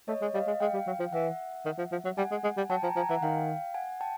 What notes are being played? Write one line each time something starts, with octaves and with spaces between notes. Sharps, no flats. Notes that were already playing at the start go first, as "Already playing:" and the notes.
A3 C#5 D#5
G#3
G3 D#5 F5
G#3
G#3 F5 G5
G3
F#3
F3
E3 E5 F#5
D#3
F3
F3
F#3
G3 F#5 G#5
G#3
G#3
G3
F#3 G5 A5
F3 G#5 A#5
F3 G#5 A#5
E3 F#5 G#5
D#3 F5 G5
F#5 G#5
G5 A5